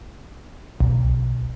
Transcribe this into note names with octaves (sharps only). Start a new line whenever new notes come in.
B1